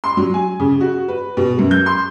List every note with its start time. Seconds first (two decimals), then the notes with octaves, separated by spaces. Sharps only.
0.04 C6
0.17 F#3
0.34 G#5
0.60 C#3
0.81 F#4
1.08 B4
1.37 B2
1.59 F#2
1.71 G6
1.86 C6